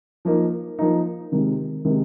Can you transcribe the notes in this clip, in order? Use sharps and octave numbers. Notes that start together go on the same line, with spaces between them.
F3 A#3 D#4
F3 A#3 D#4
C3 D#3 G#3
C3 D#3 G#3